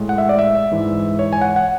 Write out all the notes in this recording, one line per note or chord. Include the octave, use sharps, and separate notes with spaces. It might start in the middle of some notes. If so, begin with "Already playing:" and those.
Already playing: A2 G#3
F#5
E5
D5
E5
G#2 E3 G#3
C#5
G#5
F#5
F#5